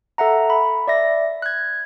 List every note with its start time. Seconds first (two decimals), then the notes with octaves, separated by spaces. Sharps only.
0.18 A4 E5 F#5 A#5
0.50 B5
0.87 D5 E5 A#6
1.42 F#6 G#6